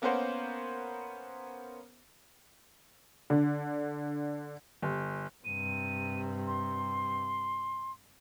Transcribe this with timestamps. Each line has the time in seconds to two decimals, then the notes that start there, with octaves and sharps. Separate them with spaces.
0.02 A#3 B3 C#4 A#4 C5 F#5
3.30 D3
4.82 G1
5.45 G2 C3 D#7
6.47 C6